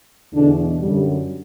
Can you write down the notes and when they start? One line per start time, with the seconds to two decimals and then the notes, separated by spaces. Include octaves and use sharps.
0.32 E2 B2 D3 D4
0.79 F#2 D3 G3